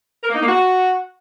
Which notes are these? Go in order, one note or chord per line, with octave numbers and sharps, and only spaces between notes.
A#4
A#3
D#4
A#3
F#4